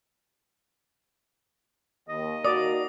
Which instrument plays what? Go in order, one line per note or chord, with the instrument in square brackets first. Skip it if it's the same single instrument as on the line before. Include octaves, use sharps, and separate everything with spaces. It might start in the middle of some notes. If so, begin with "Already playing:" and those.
[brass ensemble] D#2 [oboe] D#5
[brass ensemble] A#3 D#4 F#4 [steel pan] D5 [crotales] D#6